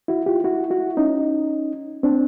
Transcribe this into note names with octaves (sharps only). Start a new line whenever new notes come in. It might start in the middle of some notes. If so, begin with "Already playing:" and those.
E4 F#4
F4 G4
E4 F#4
E4 F#4
C#4 D#4
C4 D4